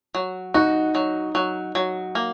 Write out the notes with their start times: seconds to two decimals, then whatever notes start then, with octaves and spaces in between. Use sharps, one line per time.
0.15 F#3
0.54 D#4 F#4
0.95 F#3
1.35 F#3
1.75 F#3
2.15 A#3